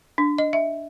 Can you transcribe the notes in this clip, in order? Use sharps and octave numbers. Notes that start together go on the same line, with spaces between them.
D4
D#5
E5